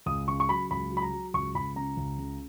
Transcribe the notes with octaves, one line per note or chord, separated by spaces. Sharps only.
C#2 D#6
C#3 C#6
C#6
F#3 B5
C#2 B5
F#3
B5
A#5
F#3
C#2 C#6
C#2 B5
C#3 A#5
C#2
C#3